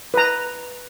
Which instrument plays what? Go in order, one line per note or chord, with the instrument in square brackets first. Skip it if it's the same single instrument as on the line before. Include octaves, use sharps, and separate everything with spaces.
[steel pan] B4 A#5